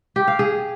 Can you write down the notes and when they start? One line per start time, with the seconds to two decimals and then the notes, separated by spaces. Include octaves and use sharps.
0.16 G4
0.28 F5
0.39 G#4